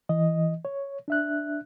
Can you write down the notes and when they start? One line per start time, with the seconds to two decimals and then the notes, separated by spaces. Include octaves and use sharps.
0.09 E3 D#5
0.65 C#5
1.08 D4 E5 F#6